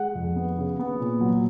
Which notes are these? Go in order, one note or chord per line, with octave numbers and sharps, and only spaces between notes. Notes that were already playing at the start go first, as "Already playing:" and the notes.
Already playing: G#3 F#5
F2
B3
C#3
B3
A#2
F#3